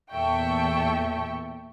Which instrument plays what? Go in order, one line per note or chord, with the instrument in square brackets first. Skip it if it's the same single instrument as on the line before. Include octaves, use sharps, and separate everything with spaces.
[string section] E2 A#2 A4 E5 G5 C#6